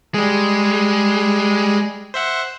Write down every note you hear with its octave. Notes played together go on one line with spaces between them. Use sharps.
G3 G#3 G#4
C5 E5 F#5